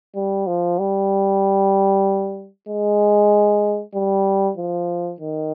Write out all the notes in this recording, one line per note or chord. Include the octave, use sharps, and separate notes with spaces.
G3
F3
G3
G#3
G3
F3
D#3